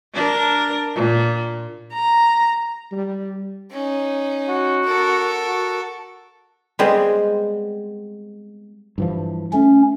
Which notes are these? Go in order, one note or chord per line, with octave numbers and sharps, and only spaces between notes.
D4 A#4
A#2
A#5
G3
C#4 D#4
F#4
A4 A#4
F#4
G3 G#3 B3 C4
G2 E3 F3
A3 C#4